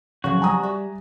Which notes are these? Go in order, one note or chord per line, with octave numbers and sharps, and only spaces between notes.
C#3 F3 F#3 C4 F#4
G3 G#5 A#5 D#6
G4 D5 E5